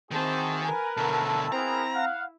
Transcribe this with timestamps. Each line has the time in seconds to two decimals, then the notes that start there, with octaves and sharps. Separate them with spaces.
0.11 D#3 C4 E4 F#4 G#4 A5
0.64 A#4 B4 G#5
0.97 B2 D3 C#4 E4 A4 A5
1.52 B3 C4 E4 G#4 A#4 A#5
1.93 F5 F#5